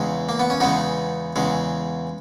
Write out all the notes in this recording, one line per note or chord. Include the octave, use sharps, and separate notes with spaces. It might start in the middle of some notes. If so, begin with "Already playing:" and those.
Already playing: E2 C#3 G#3
A#3
B3
C#4
E2 C#3 G#3 B3 D#4
E2 C#3 G#3